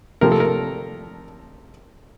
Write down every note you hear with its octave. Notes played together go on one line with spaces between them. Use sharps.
C3 F3 A3 A#4
A4
A#4